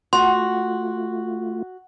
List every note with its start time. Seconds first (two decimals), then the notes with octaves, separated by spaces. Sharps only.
0.13 A3 F4 F#4 C6